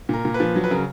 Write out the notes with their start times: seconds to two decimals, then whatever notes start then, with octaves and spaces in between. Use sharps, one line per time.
0.09 A#2 A#4
0.25 A#2
0.34 B4
0.40 F3
0.56 F#3
0.64 B4
0.70 C#3 A#4